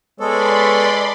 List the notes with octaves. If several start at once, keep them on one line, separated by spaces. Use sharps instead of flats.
G#3 B3 A4 B4 C#5 D5 B5 C6